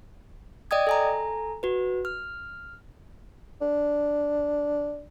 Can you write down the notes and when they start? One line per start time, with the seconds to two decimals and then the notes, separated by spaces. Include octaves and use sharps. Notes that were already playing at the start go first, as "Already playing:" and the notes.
0.71 D5 D#5 G5 D#6 G#6
0.87 A4 G#5 A#5
1.63 F#4 B4
2.05 F6
3.62 D4